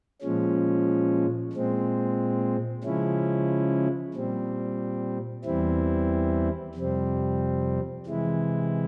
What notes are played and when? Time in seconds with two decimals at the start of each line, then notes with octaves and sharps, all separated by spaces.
0.22 A#2 F3 G#3 C#4
1.53 A#2 G#3 C4
2.84 C#3 F3 G#3 C#4 E4
4.14 A#2 G3 C4
5.44 E2 E3 G3 C4 E4
6.75 F2 C3 G3 C4
8.06 C3 E3 G#3 E4